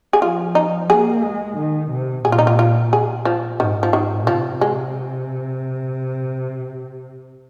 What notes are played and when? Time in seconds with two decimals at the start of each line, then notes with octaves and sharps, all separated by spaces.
0.13 G#4
0.21 F3 F4
0.55 D#4
0.90 A#3 G#4
1.24 G#3
1.56 D#3
1.90 C3
2.24 A#2 G#4
2.32 F4
2.39 D#4
2.47 F4
2.59 F4
2.93 G#4
3.25 F3
3.60 G#2 D#3
3.83 F3
3.93 D#3
4.27 C3 F3
4.61 G#3